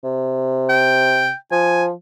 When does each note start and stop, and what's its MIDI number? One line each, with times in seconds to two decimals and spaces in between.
0.04 1.31 48
0.70 1.35 79
1.52 1.92 53
1.52 1.84 80